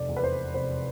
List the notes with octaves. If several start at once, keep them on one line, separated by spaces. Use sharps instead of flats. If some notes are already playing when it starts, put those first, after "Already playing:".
Already playing: F1 D5
E2
B4
C5
F1 C5